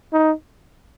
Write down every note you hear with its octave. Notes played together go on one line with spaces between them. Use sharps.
D#4